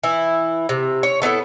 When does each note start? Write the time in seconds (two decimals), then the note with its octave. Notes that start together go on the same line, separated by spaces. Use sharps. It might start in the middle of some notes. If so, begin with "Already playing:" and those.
0.03 E3 E4
0.69 C3
1.03 C#5
1.22 A3 B3 E4 A4